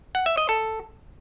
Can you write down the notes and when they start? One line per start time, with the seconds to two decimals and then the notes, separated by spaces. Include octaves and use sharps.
0.15 F#5
0.26 E5
0.37 D#5
0.49 A4